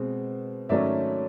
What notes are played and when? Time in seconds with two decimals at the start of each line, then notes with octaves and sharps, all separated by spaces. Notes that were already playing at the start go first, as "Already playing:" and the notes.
Already playing: B2 G#3 C4
0.69 G#2 D#3 F#3 A3 C#4 D5 E5